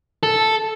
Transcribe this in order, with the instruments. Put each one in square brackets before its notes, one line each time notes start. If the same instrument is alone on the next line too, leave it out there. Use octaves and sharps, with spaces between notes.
[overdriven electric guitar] A4